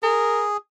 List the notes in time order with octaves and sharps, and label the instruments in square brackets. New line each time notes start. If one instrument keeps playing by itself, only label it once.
[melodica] G#4 [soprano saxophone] A#4